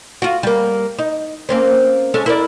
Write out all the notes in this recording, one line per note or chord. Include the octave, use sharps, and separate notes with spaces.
F4 F#4
G3 A#3
D#4
A#3 C4 C#4
G#3 C#4 A4
E4 A#4 D5